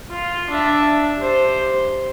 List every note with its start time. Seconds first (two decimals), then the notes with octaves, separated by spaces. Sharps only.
0.10 F4
0.50 D4 E5
1.18 G4 C5